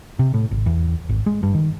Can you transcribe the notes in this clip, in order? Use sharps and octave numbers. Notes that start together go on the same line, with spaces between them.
C3
A2
G#1
E2
G#1
G#3
G2
D#3